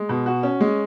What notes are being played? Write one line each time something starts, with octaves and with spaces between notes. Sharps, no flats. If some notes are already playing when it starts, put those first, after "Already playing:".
Already playing: G#3
B2
F#4
C#4
G#3